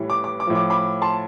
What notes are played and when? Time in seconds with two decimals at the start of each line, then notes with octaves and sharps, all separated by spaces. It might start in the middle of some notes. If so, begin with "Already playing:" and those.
Already playing: A2 E3 G3
0.10 D6
0.24 D6
0.40 D6
0.47 A2 F3
0.55 D6
0.70 B5 D6
1.02 A5 C6